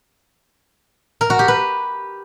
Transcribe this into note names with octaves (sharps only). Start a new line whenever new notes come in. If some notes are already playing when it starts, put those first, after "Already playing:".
A#4
F#4
G4
B4